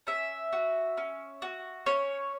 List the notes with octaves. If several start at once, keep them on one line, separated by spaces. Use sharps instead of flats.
C#4 E5
F#4
C#4
F#4
C#4 C#5